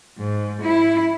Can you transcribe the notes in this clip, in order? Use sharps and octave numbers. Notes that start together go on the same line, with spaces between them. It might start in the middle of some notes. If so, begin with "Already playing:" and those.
G#2
E4